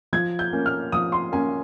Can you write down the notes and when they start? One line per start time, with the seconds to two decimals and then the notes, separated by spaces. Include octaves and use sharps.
0.13 F3 G#6
0.39 G6
0.53 A#3 C#4
0.66 F6
0.92 F3 D#6
1.12 C6
1.32 A#3 C#4 G#5